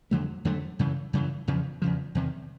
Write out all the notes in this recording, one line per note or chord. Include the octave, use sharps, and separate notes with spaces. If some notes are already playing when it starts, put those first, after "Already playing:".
F2 D3 F#3 A3
F2 D3 F#3 A3
F#2 C#3 E3
F#2 C#3 E3
E2 C#3 F3
E2 C#3 F3
E2 C3 D#3